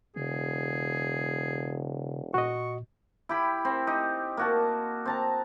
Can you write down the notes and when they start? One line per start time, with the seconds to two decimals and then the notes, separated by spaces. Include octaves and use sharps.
0.16 E1 C#3 G#4
2.34 A#2 F#4 D#5 C#6
3.29 E4 G4 B5
3.65 C4
3.87 D#4 G4
4.37 A#3 F#4 A5
5.05 C4 A5 A#5